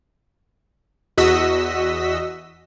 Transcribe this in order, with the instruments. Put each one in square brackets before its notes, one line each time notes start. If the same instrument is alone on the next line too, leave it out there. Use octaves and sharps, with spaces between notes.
[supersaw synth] E2 F#4 D#5 E6 B6